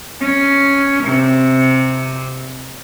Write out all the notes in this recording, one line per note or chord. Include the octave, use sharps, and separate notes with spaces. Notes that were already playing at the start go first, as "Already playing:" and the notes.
C#4
C3